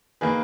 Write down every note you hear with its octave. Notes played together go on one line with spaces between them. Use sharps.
D#3 A#3 G#4 B4